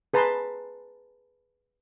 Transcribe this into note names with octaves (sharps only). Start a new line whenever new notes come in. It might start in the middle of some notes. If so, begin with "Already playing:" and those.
G#4 B4 A5 A#5 C6